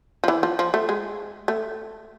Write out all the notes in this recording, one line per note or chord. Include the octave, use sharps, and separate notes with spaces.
F3
E3
F3
F3
A3
G#3
A3